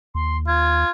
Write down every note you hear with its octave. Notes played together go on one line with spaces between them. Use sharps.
D#2 C6
F4 G#6